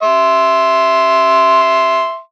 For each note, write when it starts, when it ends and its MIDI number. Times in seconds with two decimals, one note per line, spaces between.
0.03 2.19 76
0.03 2.19 84